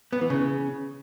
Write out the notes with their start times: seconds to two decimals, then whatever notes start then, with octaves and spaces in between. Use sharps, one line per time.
0.13 B3
0.21 E3
0.30 C#3